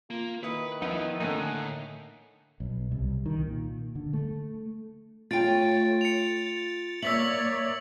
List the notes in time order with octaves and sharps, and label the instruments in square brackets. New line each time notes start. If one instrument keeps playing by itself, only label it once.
[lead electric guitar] A#3 [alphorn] F4
[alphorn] D#3 [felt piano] E4 D#6 C#7 [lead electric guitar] B4
[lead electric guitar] F3 [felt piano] B3 [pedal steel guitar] D#4 E4
[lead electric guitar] A2 [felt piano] D3 A3 A#3 [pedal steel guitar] D#4 G#5 F#6
[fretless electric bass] B1
C2
D#3
A#2
D3
A3
[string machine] A3 C#5 [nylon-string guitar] F4 G5 [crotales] A6 D7
[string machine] A6 [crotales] C#7 F7
[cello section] A#3 C#5 D5 [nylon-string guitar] E5 [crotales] E6 B6 F#7